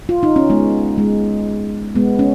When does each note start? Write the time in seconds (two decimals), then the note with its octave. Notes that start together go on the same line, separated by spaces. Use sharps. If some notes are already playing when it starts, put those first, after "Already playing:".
0.09 F4
0.23 D#4
0.36 C#4
0.50 G#3 B3
0.98 G#3
1.95 G#3 B3
2.19 C#4